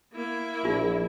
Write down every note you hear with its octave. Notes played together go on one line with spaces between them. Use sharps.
A#3 E4
A#1 D#4 F4 G#4